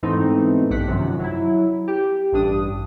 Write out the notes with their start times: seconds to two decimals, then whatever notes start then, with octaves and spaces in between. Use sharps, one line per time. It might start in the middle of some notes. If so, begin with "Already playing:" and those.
0.03 G#2 B2 E3 A3 C4 D#4
0.70 A#1 G2 G4 F#5 B6
0.87 F#2 C3 D#3 F3 F#3
1.19 F#3 E4
1.88 G4
2.32 A1 G2 D4 D#6